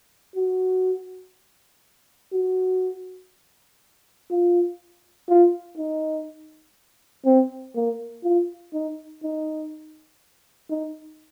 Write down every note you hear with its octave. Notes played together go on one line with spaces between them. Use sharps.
F#4
F#4
F4
F4
D#4
C4
A#3
F4
D#4
D#4
D#4